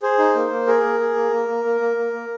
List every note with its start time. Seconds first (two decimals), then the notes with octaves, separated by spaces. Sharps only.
0.03 G#4 C5
0.18 D#4
0.35 A#3
0.51 A#3
0.67 G#4 A#4
0.84 A#3
1.00 G#4
1.16 A#3
1.32 A#3
1.48 A#3
1.65 A#3
1.81 A#3
1.97 A#3
2.13 A#3